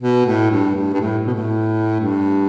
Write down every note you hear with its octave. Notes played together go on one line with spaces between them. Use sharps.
B2
A2
G2
G2
G2
A2
B2
A2
G2